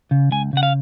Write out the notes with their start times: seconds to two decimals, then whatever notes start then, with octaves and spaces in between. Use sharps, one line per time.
0.11 C#3
0.31 C#2 G#5
0.53 C#3 F#5
0.63 F5